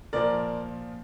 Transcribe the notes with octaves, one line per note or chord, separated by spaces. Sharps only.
A#2 F3 A#4 D5